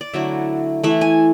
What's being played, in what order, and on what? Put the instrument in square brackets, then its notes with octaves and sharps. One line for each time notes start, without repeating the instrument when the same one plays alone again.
[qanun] D5
D3 F#3 A3 E4 E5
E3 A3 E4 E5
G#5